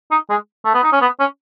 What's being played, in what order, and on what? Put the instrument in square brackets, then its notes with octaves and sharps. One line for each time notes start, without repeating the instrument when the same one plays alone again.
[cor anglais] D#4
G#3
A3
B3
D#4
C#4
B3
C#4